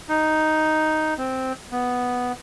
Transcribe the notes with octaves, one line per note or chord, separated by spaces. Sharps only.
D#4
C4
B3